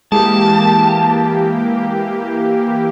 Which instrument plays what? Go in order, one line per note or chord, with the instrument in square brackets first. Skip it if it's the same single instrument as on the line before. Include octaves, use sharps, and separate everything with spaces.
[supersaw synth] E3 A#3 G4 [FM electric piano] G#3 [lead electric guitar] A5